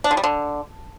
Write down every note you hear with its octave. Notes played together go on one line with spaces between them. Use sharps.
D4
D3
G3
D3